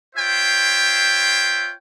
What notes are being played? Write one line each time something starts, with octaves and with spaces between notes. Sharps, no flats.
F4 C5 C#5 E5 G5